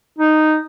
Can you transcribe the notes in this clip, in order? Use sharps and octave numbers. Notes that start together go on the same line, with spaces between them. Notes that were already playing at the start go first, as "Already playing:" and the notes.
D#4